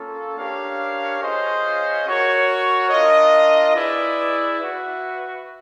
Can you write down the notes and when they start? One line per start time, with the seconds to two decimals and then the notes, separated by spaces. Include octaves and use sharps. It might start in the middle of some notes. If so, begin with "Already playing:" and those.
Already playing: A#3 C#4 F4 A4
0.37 D4 G4 A#4 C#5 F5
1.21 C#4 F4 G#4 C5 D#5
2.06 F#4 A#4 C#5
2.90 D4 F4 A#4 D#5
3.75 E4 G#4 B4 D5
4.59 F#4 B4 E5